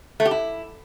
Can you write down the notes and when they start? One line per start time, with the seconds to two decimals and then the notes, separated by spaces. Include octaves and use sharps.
0.20 A3
0.25 G4
0.31 E4